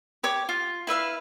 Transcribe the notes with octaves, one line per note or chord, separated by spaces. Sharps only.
G4 C#5 D6
F4
E4 B4 E5 F5